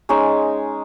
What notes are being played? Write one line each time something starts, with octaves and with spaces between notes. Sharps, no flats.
G#3 C#4 D#4 G#5